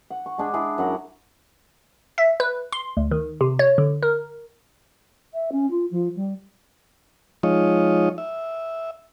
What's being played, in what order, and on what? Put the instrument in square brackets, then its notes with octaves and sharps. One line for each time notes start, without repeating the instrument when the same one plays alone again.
[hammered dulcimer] F#5
C#6
G#3 D4 G#4
D4 E4 G#4
F#2 F#5 A#5
[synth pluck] E5
B4
C6
D2
D#3
C3
C#5
D3
A#4
[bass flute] E5
C#4
F4
F3
G3
[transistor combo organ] F3 G#3 D#4 F4 C#5 D#5
E5